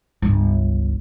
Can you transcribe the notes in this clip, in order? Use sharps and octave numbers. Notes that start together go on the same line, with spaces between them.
G1 C#2